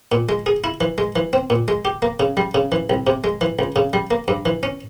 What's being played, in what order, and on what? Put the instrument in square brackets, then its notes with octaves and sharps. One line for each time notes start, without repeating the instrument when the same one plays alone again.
[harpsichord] A#2
G#3
G#4
E4
E3
G#3
E3
C4
A#2
G#3
G4
A#3
C#3
G3
C#3
E3
C2
C3
G#3
E3
C#2
C#3
G3
A#3
G2
E3
C#4